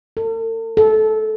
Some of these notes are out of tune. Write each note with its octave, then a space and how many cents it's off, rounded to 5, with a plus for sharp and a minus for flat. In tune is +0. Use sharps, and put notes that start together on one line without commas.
A4 +45
A4 -20